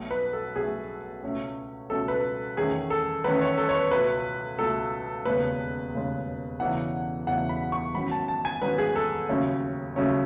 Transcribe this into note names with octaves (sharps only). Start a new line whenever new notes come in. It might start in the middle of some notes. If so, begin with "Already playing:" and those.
Already playing: B1 B2 A3
B4
A4
B1 B2 A3 G#4
C#2 B2 A3 C#4
C#2 B2 A3 C#4 A4
B4
A4
E2 D#3 A3 C#4 G#4
A4
E2 D#3 A3 C#4 B4
C#5
A4
C#5
B4
C#2 B2 A3 B4
C#2 B2 A3 A4
E1 D#2 C#3 G#3 B4
E1 D#2 C#3 G#3
E1 E2 C#3 E3 A3 F#5
E1 E2 C#3 E3 A3 F#5
B5
C#6
G#2 D#3 F#3 C#4 B5
A5
A5
G#5
G#2 D#3 F#3 C#4 B4
G#4
A4
D#2 C#3 F#3 A3 C#4
D#2 C#3 F#3 A3 C#4